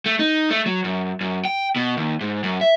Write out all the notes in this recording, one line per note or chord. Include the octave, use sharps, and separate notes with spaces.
A3
D#4
A3
F#3
F#2
F#2
G5
B2
D#2
G#2
F#2
E5